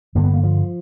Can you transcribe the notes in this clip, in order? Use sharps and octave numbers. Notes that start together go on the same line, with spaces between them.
G2 D3 A#3
B3
A#3
F3